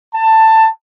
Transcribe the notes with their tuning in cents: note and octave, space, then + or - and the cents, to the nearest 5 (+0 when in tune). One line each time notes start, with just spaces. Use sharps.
A5 +15